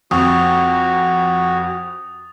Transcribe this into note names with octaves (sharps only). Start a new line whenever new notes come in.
F2 F#4 C#6 D#6 A6